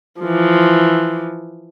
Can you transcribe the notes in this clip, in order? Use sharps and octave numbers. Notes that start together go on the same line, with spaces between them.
E3 F3